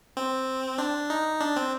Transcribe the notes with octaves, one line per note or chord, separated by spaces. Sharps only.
C4
D4
D#4
D4
C4